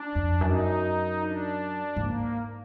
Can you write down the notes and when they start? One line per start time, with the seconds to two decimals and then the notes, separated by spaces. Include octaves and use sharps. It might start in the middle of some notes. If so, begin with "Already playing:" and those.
Already playing: D4
0.15 F2
0.41 F#2 D#4
1.19 D4
1.96 G#2 A#3